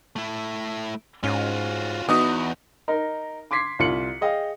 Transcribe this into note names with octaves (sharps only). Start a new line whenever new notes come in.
A3 E4
G#2 C#4 F4 F#4
E2 B3 D#4 F#4 D#6
D#4 A#4
C6 D6 G#6 B6 C7
C2 F4 C#7 F#7
G#4 D#5 F5 G5